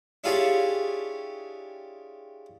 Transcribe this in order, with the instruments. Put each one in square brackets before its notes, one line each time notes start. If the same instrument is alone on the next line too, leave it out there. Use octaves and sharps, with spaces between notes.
[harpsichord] D4 E4 F4 G4 G#4 C#5